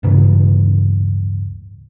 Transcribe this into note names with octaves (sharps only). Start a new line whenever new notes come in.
D1 G2 C#3 E3